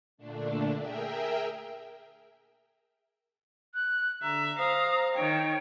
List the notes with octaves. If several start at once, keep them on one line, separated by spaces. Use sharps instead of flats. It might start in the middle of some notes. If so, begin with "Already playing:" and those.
A#2 D3 A3 D4
G#4 A#4 E5 G5
F#6
D3 E5 A#5
C5 F5 A#5 D#6
D#3 C#5 G5